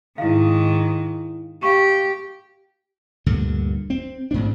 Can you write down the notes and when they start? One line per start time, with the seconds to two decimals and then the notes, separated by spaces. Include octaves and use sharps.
0.18 G#2 D#3 E4 F5
1.63 G4 F5 C#6
3.26 D2 G2 A#2 D3
3.90 C4
4.31 A1 G#2 C4 D4